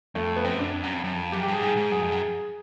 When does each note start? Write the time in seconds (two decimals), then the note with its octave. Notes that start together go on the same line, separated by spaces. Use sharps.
0.15 F2 A3
0.36 B3
0.44 F#2 C4
0.59 D4
0.73 F2
0.83 F#2
0.94 F2
1.04 F#2
1.14 F2
1.32 F#2 G4
1.43 G4
1.48 G2 G#4
1.62 G#2
1.76 G#2
1.92 F#2 G#4
2.02 F2
2.12 F#2